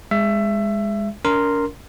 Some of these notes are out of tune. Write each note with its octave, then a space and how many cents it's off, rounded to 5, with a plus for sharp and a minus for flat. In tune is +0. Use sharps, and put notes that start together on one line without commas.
G#3 -15 E5 +20
D4 -45 A#4 -5 C6 +0